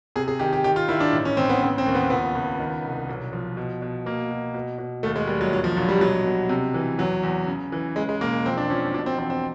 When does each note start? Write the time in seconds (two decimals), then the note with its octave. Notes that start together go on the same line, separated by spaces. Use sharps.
0.16 C3 G#4
0.28 G#4
0.39 D#3 G4
0.53 G4
0.64 D#3 G4
0.76 F4
0.88 D#3 E4
1.00 D4
1.13 A1
1.25 C#4
1.37 A1 C4
1.49 B3
1.62 C#3 C4
1.78 C4
1.86 D#2
1.95 B3
2.10 C#2 B3
2.35 C#2
2.60 D#3
2.84 C2
3.09 B1
3.33 F3
3.57 B2
3.82 B2
4.06 B2 A#3
4.31 B2
4.54 B2
4.79 B2
5.03 D#2 A3
5.16 G#3
5.27 D#2 G3
5.41 F#3
5.52 A#1 F#3
5.64 F3
5.77 A#1 F#3
5.89 G3
6.01 B2 F#3
6.25 B2
6.49 C3
6.74 E3
6.98 E2 F#3
7.23 E2
7.47 C#3
7.72 E3
7.96 C#3 G#3
8.09 G#3
8.21 E1 A#3
8.45 F2 C4
8.58 D4
8.70 F3 C#4
8.94 B2 D4
9.06 C4
9.18 E2 C4
9.30 C4